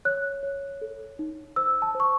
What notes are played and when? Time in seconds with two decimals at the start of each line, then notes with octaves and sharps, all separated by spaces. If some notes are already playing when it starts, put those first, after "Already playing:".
0.05 C#5 F#6
0.43 C#5
0.81 A4
1.19 D#4
1.56 C5 E6
1.82 A5
1.95 C5
2.00 C#6